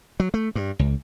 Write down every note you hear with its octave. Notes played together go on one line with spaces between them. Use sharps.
F#3
A3
G2
C#2